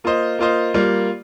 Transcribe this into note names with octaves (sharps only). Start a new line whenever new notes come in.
A#3 F4 C5 D#5
A#3 F4 C5 D#5
G3 A#3 F4